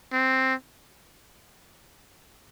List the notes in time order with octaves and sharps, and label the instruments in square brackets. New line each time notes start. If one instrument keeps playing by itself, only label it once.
[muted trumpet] C4